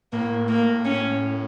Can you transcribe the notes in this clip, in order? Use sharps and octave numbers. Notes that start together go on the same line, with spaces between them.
A2 A#3
A#3
C#4